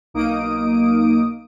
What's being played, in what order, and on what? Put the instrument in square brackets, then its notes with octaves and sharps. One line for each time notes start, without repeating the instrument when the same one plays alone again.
[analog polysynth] B1 A#3 D#4 D#6 D7